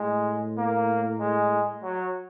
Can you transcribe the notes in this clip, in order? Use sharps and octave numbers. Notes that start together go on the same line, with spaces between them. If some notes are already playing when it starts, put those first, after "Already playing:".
Already playing: A2 G#3
A#3
G#3
F#3